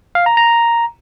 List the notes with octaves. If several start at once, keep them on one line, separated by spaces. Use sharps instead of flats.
F5
A#5
A#5